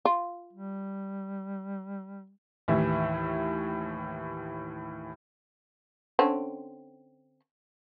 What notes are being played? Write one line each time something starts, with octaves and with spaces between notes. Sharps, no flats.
F4
G3
D#2 A2 E3 E4 E5
D3 C4 C#4